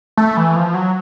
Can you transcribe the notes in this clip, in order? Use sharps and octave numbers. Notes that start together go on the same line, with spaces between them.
A3
E3
F3
F#3